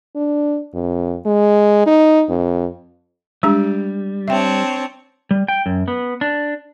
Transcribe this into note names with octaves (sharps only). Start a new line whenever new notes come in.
D4
F2
G#3
D#4
F2
G3 G#3 D4 G4
C4 D4 C#5 E5 G5
G3
G5
F#2
B3
D4